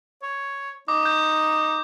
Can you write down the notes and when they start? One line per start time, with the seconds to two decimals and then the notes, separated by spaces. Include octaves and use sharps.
0.23 C#5
0.88 D#4 D6
1.05 G6